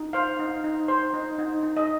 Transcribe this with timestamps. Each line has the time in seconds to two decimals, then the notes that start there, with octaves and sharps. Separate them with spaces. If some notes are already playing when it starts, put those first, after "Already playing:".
Already playing: D#4
0.13 C5 F5
0.39 D#4
0.64 D#4
0.88 C5
1.14 D#4
1.39 D#4
1.63 D#4
1.77 D#5